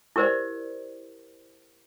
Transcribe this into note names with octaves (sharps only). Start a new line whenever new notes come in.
E4 G4 A#4 C5 D5